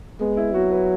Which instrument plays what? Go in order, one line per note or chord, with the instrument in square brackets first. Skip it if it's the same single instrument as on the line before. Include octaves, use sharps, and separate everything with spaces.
[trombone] G#3 [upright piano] B3
[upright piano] E4
[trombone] F#3 [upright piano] F#4
[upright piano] B4